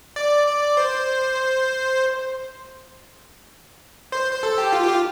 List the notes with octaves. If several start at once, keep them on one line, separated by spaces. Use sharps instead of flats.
D5
D5
C5
C5
C5
A4
G4
F4
G4
F4